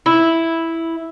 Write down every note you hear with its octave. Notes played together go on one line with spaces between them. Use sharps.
E4